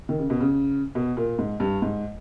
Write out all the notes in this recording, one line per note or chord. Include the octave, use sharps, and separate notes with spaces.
D#3
C#3
B2
C#3
B2
A#2
G#2
G2
G#2